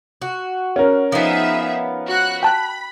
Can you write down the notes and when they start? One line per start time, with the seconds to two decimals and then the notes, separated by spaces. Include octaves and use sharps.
0.22 F#4
0.76 C#4 A#4
1.12 F3 B3 D#4 G#4 E5
2.07 F#4 F#6
2.43 G5 A5 B5 F#6